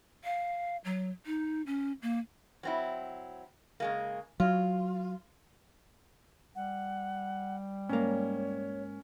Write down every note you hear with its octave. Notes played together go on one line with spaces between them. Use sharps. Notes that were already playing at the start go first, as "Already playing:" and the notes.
F5
F#3
D#4
C#4
A#3
F#3 C4 E4
C#3 G#3 A#3
F#3 F4
G3 F#5
G#2 A#3 C#4 C#5